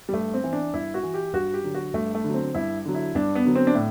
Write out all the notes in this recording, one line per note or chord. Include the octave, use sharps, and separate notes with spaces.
G3
G2 A3
C4
E3
D4
G2 E4
F#4
E3
G4
G2 F#4
G4
D3 F#3
F#4
G2 A3
A3
D3 F#3
C4
G2 E4
D3 F#3
E4
G2 D4
B3
D3 F#3
C4
D4
A2